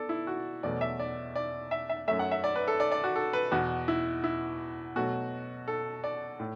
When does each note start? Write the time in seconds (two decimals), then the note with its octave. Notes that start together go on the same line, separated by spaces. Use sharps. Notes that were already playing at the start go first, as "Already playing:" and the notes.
Already playing: B3 A4 D5
0.09 E4
0.27 F#4
0.63 E2 B2 F#3 A3 D5
0.81 E5
1.00 D5
1.36 D5
1.71 E5
1.89 E5
2.07 F#2 F#3 A3 E5
2.19 F#5
2.31 E5
2.44 D5
2.56 B4
2.68 A4
2.80 D5
2.92 D5
3.04 F#4
3.16 A4
3.33 B4
3.51 E2 B2 B3 F#4
3.88 E4
4.24 E4
4.96 B2 F#3 A3 F#4
5.68 A4
6.04 D5
6.40 A2